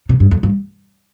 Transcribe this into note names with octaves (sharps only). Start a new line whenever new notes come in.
C3
G2
F2
G2